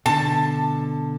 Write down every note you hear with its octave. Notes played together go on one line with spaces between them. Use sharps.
B2 D3 A5